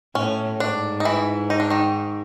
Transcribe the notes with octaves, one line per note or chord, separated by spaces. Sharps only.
A2 C#4
G#2 D4
D#4
E3 E4
D#4
D4
D#3 D#4